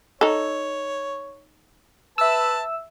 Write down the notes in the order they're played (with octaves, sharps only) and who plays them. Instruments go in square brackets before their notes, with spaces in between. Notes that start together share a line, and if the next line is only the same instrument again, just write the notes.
[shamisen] D#4 A4 [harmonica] C#5
[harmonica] B4 A5 [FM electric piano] E5 E6